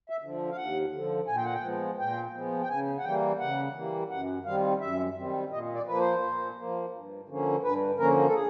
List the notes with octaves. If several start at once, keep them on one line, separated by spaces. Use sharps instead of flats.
E5
D3 F3
F5
D#2 F#5
D3 F3
A#2 G#5
G5
F#5
G5
F3 G#3 B3
A#2 G5
F3 G#3 B3
G5
C#3 G#5
F#5
E3 G3 A#3 G5
C#3 F#5
E3 G3 A#3
F#2 F#5
D#3 G3 C4 F5
F#2 E5
D#3 G3 C4
A#2 D#5
D5
F3 A#3 B4
C5
A#2
F3 A#3
G2
D3 F3 A#3 C#4
G2 B4
D3 F3 A#3 C#4 A#4
A4
G#4